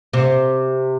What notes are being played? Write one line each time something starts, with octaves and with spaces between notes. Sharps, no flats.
C3